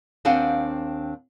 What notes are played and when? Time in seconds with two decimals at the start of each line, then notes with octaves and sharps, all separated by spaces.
0.25 D#2 C4 D4 F5 F#5 G#5